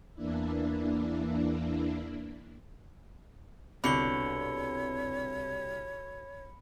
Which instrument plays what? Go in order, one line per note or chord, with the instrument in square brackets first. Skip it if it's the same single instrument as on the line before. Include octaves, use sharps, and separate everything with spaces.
[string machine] E2 E3 A#3 D4 E4
[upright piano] C2 [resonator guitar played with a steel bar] B2 D3 [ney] C#5 [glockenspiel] B5 C#7 G7